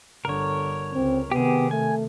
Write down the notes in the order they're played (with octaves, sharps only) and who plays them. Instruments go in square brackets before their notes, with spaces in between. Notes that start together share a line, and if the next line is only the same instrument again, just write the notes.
[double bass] G1 D3 [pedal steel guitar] A#4 C#5
[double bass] C#2 [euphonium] C4
[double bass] C3 D#3 [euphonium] B3 [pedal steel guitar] G4 G#4
[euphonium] A3 [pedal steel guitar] G#5